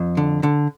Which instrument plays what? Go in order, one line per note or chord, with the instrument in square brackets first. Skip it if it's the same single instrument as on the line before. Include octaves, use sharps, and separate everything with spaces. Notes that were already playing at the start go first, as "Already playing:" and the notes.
Already playing: [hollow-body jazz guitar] F2
D3
D3